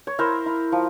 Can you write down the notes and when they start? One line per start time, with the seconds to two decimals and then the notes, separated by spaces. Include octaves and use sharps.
0.07 C#5
0.19 E4 A#4 C5
0.46 E4
0.72 F3